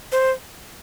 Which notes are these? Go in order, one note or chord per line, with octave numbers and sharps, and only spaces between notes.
C5